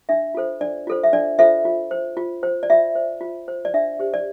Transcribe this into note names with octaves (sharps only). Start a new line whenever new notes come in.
D4 E5
F4 A4 C5
D4 D5
F4 A4 C5
E5
D4 D5
F4 A4 C5 E5
F4
C5
F4
C5
D5
F4 E5
C5
F4
C5
D5
D4 E5
G4 C5
D5